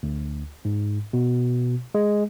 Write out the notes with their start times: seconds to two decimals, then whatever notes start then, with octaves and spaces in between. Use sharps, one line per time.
0.03 D2
0.65 G#2
1.13 B2
1.95 G#3